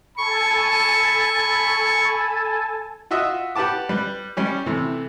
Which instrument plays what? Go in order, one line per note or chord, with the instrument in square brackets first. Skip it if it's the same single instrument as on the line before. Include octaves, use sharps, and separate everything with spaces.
[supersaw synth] A4 G#5 A5 [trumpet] B5 [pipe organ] C#6
[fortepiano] F4 F#4 D#5 E5
G4 B4 F#5 A5 D6
G3 B4
G3 C#4 G4
C3 E3 A3